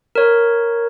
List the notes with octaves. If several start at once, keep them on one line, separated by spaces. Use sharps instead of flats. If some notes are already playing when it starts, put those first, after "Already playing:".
A#4 C#5